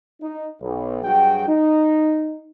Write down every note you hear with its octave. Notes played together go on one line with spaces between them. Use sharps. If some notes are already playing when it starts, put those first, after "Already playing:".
D#4
B1
G2 F#3 F#4 G#4 G5
D#4